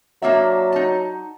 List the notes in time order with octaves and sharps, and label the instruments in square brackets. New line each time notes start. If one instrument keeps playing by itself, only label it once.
[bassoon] F#3 [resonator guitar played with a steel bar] A#3 D4 E5
[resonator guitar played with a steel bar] D#4 A5